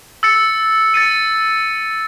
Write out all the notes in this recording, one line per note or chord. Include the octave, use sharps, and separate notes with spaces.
E6 A6 C#7
A6 C#7 D#7